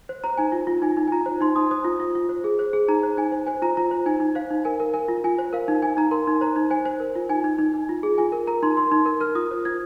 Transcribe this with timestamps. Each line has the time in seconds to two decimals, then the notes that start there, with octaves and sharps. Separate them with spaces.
0.09 C5
0.24 C5 A#5
0.37 D#4 G#5
0.52 F4
0.67 F4
0.82 D#4 G#5
0.97 D#4
1.07 G#5
1.12 F4 A#5
1.26 C5
1.41 D#4 C6
1.56 D#4 D#6
1.71 C5 D#6
1.85 F4
2.00 F4
2.15 F4
2.29 C5
2.44 G#4
2.59 C5
2.73 G#4
2.88 D#4 A#5
3.03 C5
3.17 D#4 G#5
3.32 C5
3.47 C5 G#5
3.62 F4 A#5
3.77 F4 A#5
3.91 C5
4.06 D#4 G#5
4.20 D#4
4.35 C5 F5
4.51 D#4
4.65 A#4 G#5
4.80 A#4
4.94 A#4 G#5
5.09 F4
5.24 F4 G#5
5.38 C5
5.53 A#4 F5
5.68 D#4
5.82 D#4 G#5
5.97 D#4 A#5
6.11 A#4 C6
6.27 D#4
6.41 C5 A#5
6.56 D#4
6.70 C5 G#5
6.86 C5
7.00 A#4
7.16 F4
7.29 D#4 G#5
7.44 D#4
7.59 D#4
7.74 D#4
7.89 F4
8.03 G#4
8.18 F4 G#5
8.32 A#4
8.47 A#4 A#5
8.63 D#4 C6
8.77 A#4 C6
8.92 D#4
9.06 A#4
9.20 A#4 F6
9.35 F4 D#6
9.51 C5
9.65 F4 G#6